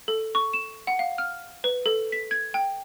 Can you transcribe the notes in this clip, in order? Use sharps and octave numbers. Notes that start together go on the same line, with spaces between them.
A4
C#6
E7
F#5
F5
F6
B4
A4
B6
G#6
G5